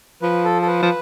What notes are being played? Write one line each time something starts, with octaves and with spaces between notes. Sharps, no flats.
F3 B4
A4
A4
B4
F3